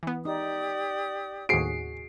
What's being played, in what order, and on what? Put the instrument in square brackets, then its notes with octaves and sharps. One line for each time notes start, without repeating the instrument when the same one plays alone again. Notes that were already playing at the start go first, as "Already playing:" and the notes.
[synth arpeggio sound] E3 B3
[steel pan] D#4 [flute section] G4 D5 D#6
[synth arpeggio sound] D#2 A2 C3 [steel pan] F#4 G#4 [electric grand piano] C7 D7